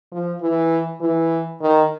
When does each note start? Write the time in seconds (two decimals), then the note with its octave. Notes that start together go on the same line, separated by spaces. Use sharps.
0.12 F3
0.41 E3
1.01 E3
1.61 D#3